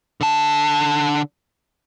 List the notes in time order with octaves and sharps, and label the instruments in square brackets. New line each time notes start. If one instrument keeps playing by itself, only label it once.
[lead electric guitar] D3 A5